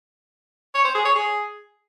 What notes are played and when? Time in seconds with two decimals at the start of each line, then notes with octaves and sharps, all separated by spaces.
0.75 C#5
0.85 C5
0.95 G#4
1.05 C#5
1.15 G#4